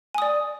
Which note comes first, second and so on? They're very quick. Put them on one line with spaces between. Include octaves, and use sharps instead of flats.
G#5 D#6 D5